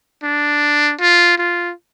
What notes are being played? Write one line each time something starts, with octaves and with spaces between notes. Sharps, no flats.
D4
F4
F4